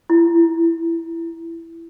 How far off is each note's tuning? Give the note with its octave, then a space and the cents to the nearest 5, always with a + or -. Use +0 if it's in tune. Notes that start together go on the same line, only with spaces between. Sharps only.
E4 +15